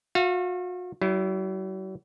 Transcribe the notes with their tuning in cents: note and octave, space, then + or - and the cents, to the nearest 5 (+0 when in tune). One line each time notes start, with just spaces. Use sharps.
F#4 -40 F5 -25
F#3 +45 E4 +0